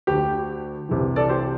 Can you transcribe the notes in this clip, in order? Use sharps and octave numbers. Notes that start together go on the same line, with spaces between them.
D2 D3 G4
C2 C3 E3
A4 D5
G4 C5